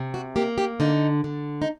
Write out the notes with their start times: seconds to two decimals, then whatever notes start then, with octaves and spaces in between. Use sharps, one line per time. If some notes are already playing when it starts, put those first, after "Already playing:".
Already playing: C3
0.14 F#4
0.36 A#3 G4
0.58 G4
0.80 D3 D#4
1.24 D3
1.62 D#4